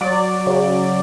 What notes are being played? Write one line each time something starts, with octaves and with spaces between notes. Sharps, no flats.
F#3 D5
C#3